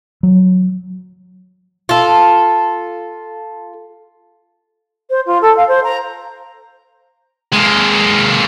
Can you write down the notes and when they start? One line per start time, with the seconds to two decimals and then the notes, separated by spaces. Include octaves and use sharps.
0.23 F#3
1.89 F4 A4
5.10 C5
5.26 F4
5.41 A4
5.56 F5
5.68 C5
5.83 A#5
7.53 G#3 A#3